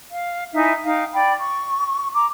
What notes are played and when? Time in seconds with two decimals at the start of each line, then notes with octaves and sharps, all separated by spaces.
0.10 F5
0.54 D#4 E4 E5 G#5
0.83 D#4 F5 G5
1.13 D5 G5 B5
1.39 C#6
2.15 A#5 D6